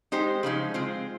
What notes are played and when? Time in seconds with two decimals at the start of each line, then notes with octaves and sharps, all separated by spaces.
0.12 G#3 D#4 G4 C5
0.43 C#3 F3 G#3 D#4
0.74 G#3 C4 F4 C5